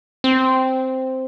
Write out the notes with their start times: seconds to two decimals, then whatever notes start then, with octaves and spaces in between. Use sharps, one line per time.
0.24 C4